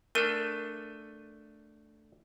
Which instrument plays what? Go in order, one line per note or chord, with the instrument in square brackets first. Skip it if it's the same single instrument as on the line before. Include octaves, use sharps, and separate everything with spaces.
[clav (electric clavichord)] A3 D4 A4 [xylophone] A#4 D#7